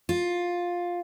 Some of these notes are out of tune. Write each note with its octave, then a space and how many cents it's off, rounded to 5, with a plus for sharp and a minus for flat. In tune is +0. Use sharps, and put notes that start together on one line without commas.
F4 +10